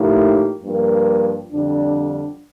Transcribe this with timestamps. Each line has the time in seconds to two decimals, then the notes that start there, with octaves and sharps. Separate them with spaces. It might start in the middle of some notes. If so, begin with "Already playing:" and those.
Already playing: A2 F3 A#3 D#4 G4
0.64 G2 F3 A#3
1.51 F2 D3 G3 D4